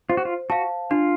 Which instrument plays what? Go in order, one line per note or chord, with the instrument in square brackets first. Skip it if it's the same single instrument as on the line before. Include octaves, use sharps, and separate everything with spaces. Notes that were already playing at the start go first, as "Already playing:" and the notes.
[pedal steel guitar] F4 [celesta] C5
[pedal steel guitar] F#4
F4
[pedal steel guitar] F#4 [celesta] F5 A5
[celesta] D4 [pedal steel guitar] F4